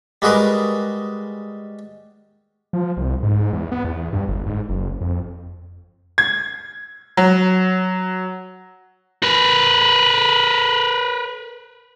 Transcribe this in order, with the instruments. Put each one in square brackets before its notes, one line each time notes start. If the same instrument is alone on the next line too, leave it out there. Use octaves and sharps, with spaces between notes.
[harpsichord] G3 G#3 F#4 G#4 A#4 B4
[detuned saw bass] F3
C2
G#2
E2
B3
E2
G2
G1
G#2
F#1
F2
[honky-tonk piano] G#6
F#3
[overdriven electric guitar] A#4 B4